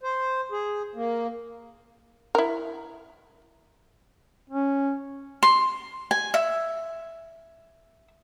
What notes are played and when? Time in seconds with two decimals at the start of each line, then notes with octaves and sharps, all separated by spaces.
0.03 C5
0.52 G#4
0.95 A#3
2.35 E4 A#4
4.50 C#4
5.43 C6
6.11 G#5
6.34 E5